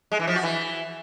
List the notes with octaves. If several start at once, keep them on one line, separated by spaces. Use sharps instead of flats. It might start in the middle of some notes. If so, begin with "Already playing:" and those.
G#3
E3
F3
F#4
E3